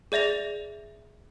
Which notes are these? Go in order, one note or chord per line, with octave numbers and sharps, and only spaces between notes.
G#4 D5 E5 A#6 F7